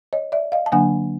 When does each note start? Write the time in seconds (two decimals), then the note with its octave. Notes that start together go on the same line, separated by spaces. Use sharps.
0.13 C#5 D#5
0.32 D5 E5
0.52 D#5 F5
0.66 A5
0.72 D3 F#3 A#3 D4 F#5 G#5